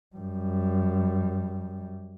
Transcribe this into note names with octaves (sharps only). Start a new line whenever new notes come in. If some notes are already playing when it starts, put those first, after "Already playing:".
F#2 G3